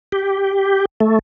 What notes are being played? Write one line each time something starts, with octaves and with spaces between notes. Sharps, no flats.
G4
A3